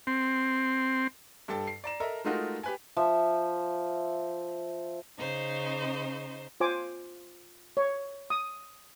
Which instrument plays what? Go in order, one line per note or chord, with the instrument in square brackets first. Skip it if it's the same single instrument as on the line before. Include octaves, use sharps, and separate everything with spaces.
[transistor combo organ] C4
[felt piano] G2 A4 G5 A5
C7
D5 A#5 E7
A4 A#4 D#5 E5 A5 A#5
G#3 A3 D#4 F4 F#4 A#4
G4 B4 G#5
[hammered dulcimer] F3 E5
[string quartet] C#3 D#4 C5
[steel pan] F4 C5 G#5 D6
C#5
D#6